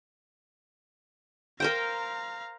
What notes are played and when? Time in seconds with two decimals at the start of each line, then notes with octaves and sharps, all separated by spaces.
1.60 A#4 C5 F5 G5 A#5